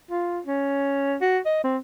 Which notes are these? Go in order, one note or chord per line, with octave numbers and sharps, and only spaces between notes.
F4
C#4
F#4
D#5
C4